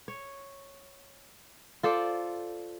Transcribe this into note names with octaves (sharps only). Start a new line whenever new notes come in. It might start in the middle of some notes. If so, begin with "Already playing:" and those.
C#5
F4 A4 C5 D5